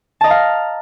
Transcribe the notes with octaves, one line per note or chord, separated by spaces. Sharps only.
D#5 F5 A5 A#5